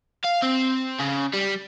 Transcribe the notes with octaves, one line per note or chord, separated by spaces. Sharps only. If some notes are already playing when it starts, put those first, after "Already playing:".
F5
C4
C#3
G3